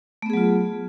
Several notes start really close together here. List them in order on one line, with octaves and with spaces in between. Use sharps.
A3 B3 G#4 F#3 F4